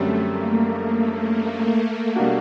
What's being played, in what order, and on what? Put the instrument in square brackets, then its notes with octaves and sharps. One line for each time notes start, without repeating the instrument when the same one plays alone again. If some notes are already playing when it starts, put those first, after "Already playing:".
Already playing: [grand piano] F#2 D3 G3 C4 [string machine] A3
[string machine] A#3
[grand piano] B2 G3 A#3 D4 F#4